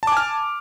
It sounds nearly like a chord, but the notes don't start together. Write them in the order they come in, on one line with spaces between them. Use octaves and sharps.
A5 D6 G#5 F6